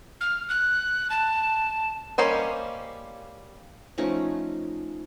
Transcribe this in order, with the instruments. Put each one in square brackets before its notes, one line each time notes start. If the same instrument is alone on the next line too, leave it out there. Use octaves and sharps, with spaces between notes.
[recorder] F6
F#6
A5
[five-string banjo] G3 A#3 C#4 C5 D#5
[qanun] F3 A3 C#4 D#4